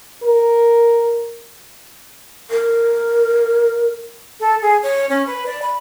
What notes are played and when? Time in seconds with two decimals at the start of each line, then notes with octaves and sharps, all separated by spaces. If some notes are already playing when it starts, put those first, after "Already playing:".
0.23 A#4
2.50 A#4
4.40 A4
4.62 G#4
4.83 C#5
5.09 C#4
5.27 B4
5.46 D5
5.62 B5